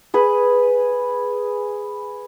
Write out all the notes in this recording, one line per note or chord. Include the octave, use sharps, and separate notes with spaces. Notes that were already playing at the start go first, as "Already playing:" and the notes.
G#4 B4